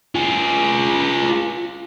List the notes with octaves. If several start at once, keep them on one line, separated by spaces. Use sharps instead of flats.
F4 G#4